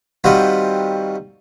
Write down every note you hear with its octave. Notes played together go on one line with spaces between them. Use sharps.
D#3 G3 C4 F4 F#4 B4